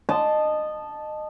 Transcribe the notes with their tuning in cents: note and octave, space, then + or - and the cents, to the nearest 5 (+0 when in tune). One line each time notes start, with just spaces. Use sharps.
D#5 -20 A5 -5